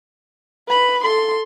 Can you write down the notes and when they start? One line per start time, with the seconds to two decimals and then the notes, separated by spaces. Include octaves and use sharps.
0.68 B4 B5
1.04 A4 C6